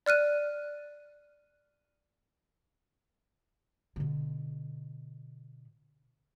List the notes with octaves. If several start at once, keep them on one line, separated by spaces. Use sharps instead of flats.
D5 F6 F#6 D#7
B2 D3